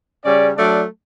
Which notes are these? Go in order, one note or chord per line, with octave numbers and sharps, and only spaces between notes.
C#3 G3 C#4 D5
F#3 A3 D4 D5